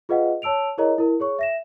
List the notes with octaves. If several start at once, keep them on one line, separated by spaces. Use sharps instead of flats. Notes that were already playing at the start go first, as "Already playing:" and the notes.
F4 G#4 B4 D#5 F5 F#5
C#5 A5 E6 D7 F7
E4 G#4 A#4 C#5 D#5 A#5
E4 A#4
G#4 C#5 C#6
E5 A#6 E7